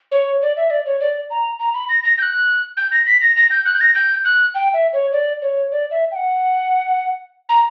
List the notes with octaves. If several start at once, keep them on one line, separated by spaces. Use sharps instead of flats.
C#5
D5
E5
D5
C#5
D5
A#5
A#5
B5
A#6
A#6
G6
F#6
G6
A#6
B6
A#6
A#6
G6
F#6
G6
A#6
G6
F#6
G5
E5
C#5
D5
C#5
D5
E5
G5
F#5
A#5